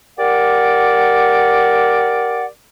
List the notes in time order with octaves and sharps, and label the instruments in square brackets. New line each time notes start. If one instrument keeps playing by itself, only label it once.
[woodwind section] G4 A#4 D5 F#5